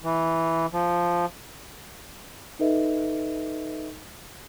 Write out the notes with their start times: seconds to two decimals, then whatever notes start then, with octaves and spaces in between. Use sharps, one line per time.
0.04 E3
0.73 F3
2.59 D#4 A4 B4 D#5 E5